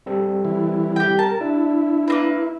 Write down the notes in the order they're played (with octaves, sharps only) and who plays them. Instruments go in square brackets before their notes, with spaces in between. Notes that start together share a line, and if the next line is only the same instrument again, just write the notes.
[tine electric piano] G3 C4 A4
[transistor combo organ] E3
[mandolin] G4 G5
[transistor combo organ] A#4 [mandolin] A5
[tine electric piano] D4 [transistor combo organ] E4
[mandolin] A#3 C4 B4